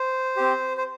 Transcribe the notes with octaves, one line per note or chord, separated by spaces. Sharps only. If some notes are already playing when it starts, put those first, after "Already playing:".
Already playing: C5
C4 G4
C5